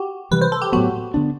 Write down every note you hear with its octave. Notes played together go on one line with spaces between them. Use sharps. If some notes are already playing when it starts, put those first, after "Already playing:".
Already playing: F#4 G4
C3 E3 G3 B4
C5
A4
G4
A2 F#3 B3 F#4
D3 F#3 B3 D4